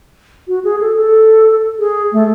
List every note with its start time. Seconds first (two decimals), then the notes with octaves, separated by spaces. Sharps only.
0.48 F#4
0.64 G#4
0.81 A4
0.97 A4
1.79 G#4
2.12 A3